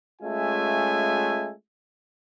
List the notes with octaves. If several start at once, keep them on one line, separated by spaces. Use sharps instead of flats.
G#3 A3 C#4 F4 E5 G#5